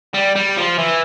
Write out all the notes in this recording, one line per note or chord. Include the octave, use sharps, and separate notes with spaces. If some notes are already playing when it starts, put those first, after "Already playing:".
G3
G3
F3
E3